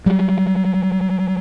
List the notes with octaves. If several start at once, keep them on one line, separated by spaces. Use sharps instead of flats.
F#3 G3